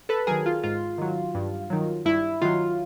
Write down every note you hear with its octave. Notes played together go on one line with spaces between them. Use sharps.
A4 B4
D#3 F#3 G#4 A#4
F4
G#2 F4
D#3 F#3
G2
D#3 F#3
G2 E4
D#3 F#3 F4